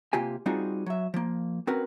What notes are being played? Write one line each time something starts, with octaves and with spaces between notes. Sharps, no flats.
C3 A#3 F4 G4 G#5
G3 C4 D#4 F4 F#4 G#4
F#3 E5
F3 A#3
C4 C#4 F#4 A#4 B4